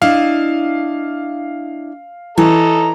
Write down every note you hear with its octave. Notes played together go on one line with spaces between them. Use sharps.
D4 E4 D#5 F5
E3 A4 C#5 D#5 A#5